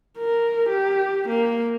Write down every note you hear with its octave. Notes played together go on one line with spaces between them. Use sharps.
A#4
G4
A#3